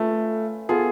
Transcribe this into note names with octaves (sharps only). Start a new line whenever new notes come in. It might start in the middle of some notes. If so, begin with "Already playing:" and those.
Already playing: A3 C#4 F4 B4
B3 F4 G#4 A4